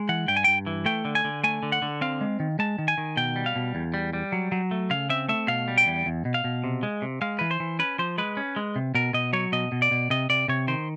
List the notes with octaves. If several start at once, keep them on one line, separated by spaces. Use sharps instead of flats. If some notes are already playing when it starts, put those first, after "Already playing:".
Already playing: G#3
E3 F#5
G2 G5
G#5
G2 G5
E3
A3 G5
D3
G#5
D3
A3 G#5
D3
F#5
D3
C4 F5
G#3
D#3
G#3 A5
D#3
G#5
D#3
B2 G5
G3
F5
B2
E2
G3
G3
F#3
F#3
A3
C#3 F5
C4 E5
A3 E5
B2 F5
G3
G5
E2
E2
B2
F5
B2
C3
G#3
C3
G#3 F5
E3 B4
C5
E3
C#4 B4
F3 C5
G#3 B4
C#4
G#3
C3
B2 A#4
B2 D#5
F#3 C#5
B2 D#5
B2
D5
B2
C3 D#5
C3 D5
C3 C#5
D#3 C5